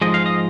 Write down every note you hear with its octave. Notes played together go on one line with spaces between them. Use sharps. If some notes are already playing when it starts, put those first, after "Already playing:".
G#2 F3 G#3 D#5
F5
D#5